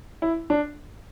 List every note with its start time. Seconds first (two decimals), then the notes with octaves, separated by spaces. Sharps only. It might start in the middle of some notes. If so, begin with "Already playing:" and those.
0.22 E4
0.50 D4